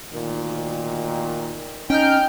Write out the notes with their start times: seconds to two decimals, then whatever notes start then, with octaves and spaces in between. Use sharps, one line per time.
0.13 D2 A#2 D#3
1.90 C#4 D#4 G5 F6 G6